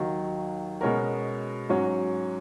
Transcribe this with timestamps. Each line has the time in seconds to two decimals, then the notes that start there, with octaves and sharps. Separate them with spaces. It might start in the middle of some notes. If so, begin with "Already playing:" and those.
Already playing: D#2 D#3 F#3
0.81 B2 G#3 C#4 F#4 A#4
1.69 G#2 F#3 C#4 F#4